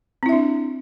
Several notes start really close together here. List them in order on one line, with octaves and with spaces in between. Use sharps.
C4 E4 E5 D4